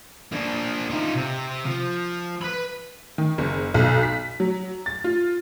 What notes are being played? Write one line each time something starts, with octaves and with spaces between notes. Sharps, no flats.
A#3 D4
D#4 F4
C3
F3
B4 B5
D#3
F#1
B1
B6
F#3
A6
F4